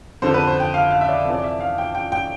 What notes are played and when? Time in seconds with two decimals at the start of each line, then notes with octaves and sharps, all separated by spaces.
0.22 F2 D3 C5
0.34 B4
0.47 C5
0.60 G5
0.74 F5
0.91 F5
1.01 E5
1.09 D5
1.25 F2 C3 E3
1.34 D5
1.43 E5
1.60 F5
1.78 G5
1.95 G5
2.12 G5